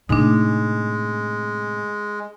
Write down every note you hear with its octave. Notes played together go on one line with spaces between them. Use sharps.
A2 C3 G#3 D4 D#4